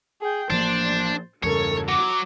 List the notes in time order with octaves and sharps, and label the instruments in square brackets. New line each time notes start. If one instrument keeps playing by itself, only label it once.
[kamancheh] G#4 G5
[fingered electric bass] A1 F3 A#3 [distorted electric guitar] D4 [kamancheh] C5
[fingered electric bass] E2 G2 C#3 [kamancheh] A4 A#4 [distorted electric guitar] C#5
[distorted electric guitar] F#3 [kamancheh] D6